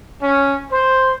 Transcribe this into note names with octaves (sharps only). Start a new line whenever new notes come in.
C#4
C5